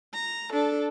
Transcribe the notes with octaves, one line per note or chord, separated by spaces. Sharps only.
A#5
D4 A4